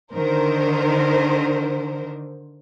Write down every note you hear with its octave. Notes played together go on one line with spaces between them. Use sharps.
D3 D#3 A#4 C5